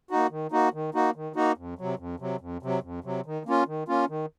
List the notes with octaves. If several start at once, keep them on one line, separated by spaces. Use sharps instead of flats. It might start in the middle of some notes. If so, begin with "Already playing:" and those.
A#3 D#4 F#4
D#3
A#3 D#4 F#4
D#3
A#3 D#4 F#4
D#3
A#3 D#4 F#4
F2
C3 F#3
F2
C3 F#3
F2
C3 F#3
F2
C3 F#3
D#3
A#3 C#4 F4
D#3
A#3 C#4 F4
D#3